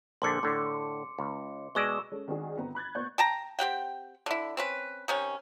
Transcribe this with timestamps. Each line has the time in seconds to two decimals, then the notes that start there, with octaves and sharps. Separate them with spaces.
0.22 A#1 D3 D4 C6 D6 C#7
0.43 A2 D3
1.19 C#2
1.75 B2 G#3 D5 C#6 E6 E7
2.12 G#3 C#4 A4
2.28 D#3 G#3 C4 D4 F#4 G#4
2.56 G1 B3 C4 A#5
2.75 B5 F#6 G#6 A6
2.95 A#2 B3 C5 C#6 G6
3.18 G5 A5 A#5
3.59 C4 G4 F#5 G5
4.26 D3 E4
4.57 C4 C#4 B4
5.08 C3 D#3 C#4